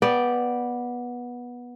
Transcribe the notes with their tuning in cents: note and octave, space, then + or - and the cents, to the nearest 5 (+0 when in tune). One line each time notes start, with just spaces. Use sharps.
B3 -15 D5 +0 G5 +0